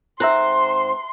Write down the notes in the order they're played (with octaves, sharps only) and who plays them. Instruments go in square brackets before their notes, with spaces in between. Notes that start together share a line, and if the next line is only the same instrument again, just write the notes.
[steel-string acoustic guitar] G#2 C4 C5 [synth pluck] E5 A#5 F#6 [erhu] C6